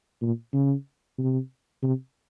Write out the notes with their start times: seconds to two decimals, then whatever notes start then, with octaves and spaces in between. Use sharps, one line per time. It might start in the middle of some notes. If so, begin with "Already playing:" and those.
0.21 A#2
0.53 C#3
1.18 C3
1.83 C3